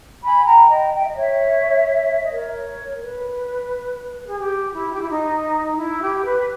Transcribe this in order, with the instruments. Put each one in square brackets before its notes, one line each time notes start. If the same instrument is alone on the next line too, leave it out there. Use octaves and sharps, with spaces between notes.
[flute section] G#5 B5
G5 A#5
D#5 G5
G5
E5
D#5
C#5 E5
D#5
A#4 C#5
B4
G#4
G4
E4
G4
E4
D#4
E4
G4
B4